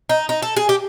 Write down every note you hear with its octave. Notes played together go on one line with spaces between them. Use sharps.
D#4
D#4
A4
G#4
G4